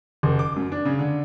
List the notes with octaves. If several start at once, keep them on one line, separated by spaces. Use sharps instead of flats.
F#1
D6
F#2
D4
C#3
D3